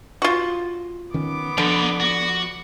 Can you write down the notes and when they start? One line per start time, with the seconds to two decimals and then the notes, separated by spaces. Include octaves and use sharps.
0.22 F4 F#4
1.14 D#3 B3 C#4 D6
1.58 D3 F3 D#4 B4
2.00 F#4